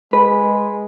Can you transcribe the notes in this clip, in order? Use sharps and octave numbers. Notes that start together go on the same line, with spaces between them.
G#3 B4